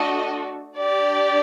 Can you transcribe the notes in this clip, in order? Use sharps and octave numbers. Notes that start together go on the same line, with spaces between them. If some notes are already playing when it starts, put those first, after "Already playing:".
Already playing: A3 D4 F#4 A4 D#5
D4 G4 D5